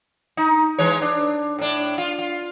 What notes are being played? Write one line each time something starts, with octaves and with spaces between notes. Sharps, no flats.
D#4
E3 G#3 C#5
D4
A2 D4
F4
F4